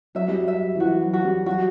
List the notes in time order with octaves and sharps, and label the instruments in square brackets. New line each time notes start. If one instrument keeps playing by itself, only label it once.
[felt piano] F#3 [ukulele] E5
[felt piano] G3
F#3
[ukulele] E5
[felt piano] E3
[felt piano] F3 [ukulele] F#4
[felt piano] F#3
[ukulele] F#4
[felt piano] G3
[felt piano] F#3 [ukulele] F#4